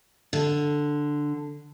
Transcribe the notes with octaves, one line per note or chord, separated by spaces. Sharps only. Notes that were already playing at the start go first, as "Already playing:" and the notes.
D3